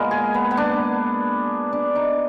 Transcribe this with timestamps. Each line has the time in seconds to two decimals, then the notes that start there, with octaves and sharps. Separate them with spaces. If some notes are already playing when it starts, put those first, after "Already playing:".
Already playing: A#2 G#3 B3 A#4
0.11 G#4
0.34 B3
0.51 B3
0.57 D4
1.73 D4
1.95 D#4